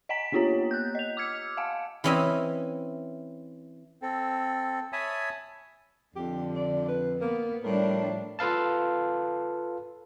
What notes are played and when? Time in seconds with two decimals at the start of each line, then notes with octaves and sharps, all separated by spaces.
0.09 D#5 F#5 G#5 A#5 B6
0.32 A#3 B3 F4 G4 C#5 A#5
0.71 F#6 G6
0.95 D#5 F7
1.17 D6 E6 F6 G#6 C#7
1.57 F5 F#5 G#5 A5
2.04 E3 C4 C#4 E4 D#5 E5
4.02 C4 A4
4.93 C#5 E5 G#5 A5 B5 D#6
6.16 F2 D3 G4
6.56 D5
6.88 B4
7.21 A#3 B3
7.64 A2 F3 G3 D4 A#4
8.39 F4 A4 B4 F5 A5